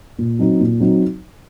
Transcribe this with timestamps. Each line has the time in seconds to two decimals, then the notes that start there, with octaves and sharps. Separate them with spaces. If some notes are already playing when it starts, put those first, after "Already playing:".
0.19 A#2
0.39 F#3 C4 D#4
0.60 A#2
0.80 F#3 C4 D#4